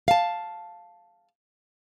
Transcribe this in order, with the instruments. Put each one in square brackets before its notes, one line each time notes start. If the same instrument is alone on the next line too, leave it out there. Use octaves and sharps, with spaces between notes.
[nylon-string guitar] F5 A5